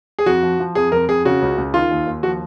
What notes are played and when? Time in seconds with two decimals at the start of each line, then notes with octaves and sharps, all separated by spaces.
0.19 G#4
0.26 F2 F#4
0.43 F3
0.60 F3
0.75 F2 G#4
0.92 F2 A#4
1.09 F2 G#4
1.25 C#3 F#4
1.42 C#2
1.58 C#2
1.74 D#3 F4
1.91 D#2
2.07 D#2
2.23 F3 F#4